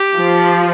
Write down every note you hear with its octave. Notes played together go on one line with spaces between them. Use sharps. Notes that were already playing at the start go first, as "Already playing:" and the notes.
Already playing: G4
F3